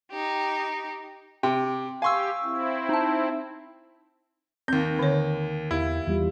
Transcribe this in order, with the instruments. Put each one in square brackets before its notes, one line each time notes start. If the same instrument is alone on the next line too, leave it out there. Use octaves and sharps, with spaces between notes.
[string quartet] D#4 G4
[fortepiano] C3 [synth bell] G5
[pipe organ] G4 [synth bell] F5 C#6 E6 [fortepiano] G#5 C6
[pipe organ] C4 E4
[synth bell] D#4 A5
[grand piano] D#2 G6 [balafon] C4
[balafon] D3 C#5
[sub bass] E2 [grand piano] E4 [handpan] G4 F5
[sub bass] E2 [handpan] E3 G3 F4